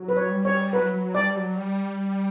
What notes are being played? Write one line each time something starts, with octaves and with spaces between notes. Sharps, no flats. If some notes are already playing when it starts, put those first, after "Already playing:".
Already playing: F#3
B4
C#5
G3
C#5
F#3 B4
F#3
G3 D5
F#3
G3